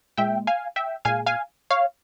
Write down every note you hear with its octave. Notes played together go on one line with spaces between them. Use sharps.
A#2 G#3 E5 G5
F5 G#5
E5 G5
A#2 G#3 F5 G#5
F5 G#5
C#5 F5